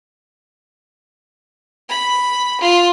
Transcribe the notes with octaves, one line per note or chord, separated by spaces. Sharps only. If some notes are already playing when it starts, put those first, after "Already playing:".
B5
F4